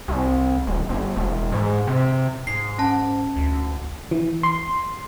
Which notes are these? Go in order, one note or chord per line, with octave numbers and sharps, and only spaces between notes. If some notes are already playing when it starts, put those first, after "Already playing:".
C2
D#1
G1
E1
G#2
C3
G#2 C7
C#4 A5
D2
E3
C6